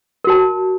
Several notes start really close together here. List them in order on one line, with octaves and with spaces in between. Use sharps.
A#4 F#4 A5